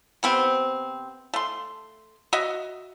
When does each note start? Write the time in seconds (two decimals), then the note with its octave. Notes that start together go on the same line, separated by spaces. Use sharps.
0.23 C3 B3 C4
1.34 A3 C6
2.33 F#4 D#5 E5